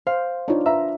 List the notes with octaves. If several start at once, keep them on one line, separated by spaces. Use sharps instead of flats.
C5 F5
D4 D#4 F4 C#5
B4 E5 F5 A#5